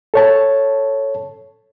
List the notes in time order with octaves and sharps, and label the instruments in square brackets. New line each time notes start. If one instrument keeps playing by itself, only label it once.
[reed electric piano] A4 C#5 A5